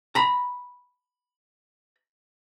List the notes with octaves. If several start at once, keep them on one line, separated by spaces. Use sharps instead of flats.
A#5 B5